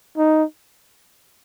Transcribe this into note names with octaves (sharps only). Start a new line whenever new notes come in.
D#4